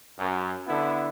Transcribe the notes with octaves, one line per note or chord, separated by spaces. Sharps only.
F#2
D3 B3 E4